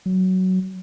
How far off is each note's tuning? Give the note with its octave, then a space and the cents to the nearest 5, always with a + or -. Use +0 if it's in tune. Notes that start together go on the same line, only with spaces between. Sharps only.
F#3 +10